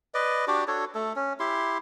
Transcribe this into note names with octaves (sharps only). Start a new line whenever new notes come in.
B4 D5 D#5
D4 F#4 G4 D5
D4 F#4 A4 C#5
A3 A4
C#4
E4 G4 C6